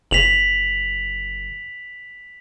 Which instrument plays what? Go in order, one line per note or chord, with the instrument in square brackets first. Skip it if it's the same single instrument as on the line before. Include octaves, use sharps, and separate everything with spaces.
[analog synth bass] F#1 [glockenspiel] B6 F7 F#7